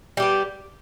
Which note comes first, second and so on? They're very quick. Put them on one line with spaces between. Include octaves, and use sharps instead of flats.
G3 G4 B3